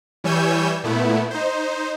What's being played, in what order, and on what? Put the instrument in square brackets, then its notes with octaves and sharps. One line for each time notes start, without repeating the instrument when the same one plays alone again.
[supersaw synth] E3 G3 C#5 G#5 E6 G6
A#2 A3 B3 E4
D#4 C5